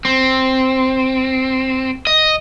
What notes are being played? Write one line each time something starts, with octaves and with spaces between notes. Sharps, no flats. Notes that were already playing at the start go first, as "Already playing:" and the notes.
C4
D#5